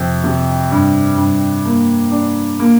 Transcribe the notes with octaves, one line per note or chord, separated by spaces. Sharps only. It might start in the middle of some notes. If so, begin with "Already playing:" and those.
Already playing: F2 C3
C3
G2
G2
A#3
D4
A#3